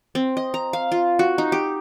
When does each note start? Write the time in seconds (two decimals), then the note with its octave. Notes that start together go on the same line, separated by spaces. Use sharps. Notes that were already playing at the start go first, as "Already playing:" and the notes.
0.15 C4
0.37 D#5
0.54 A#5
0.73 F5
0.92 F4
1.19 F#4
1.38 D#4
1.52 G4